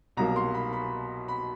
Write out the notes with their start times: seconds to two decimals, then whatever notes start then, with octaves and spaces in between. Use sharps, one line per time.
0.17 C2 B2 F#3 A#3 A#5
0.36 C6
0.54 B5
0.73 B5
1.28 B5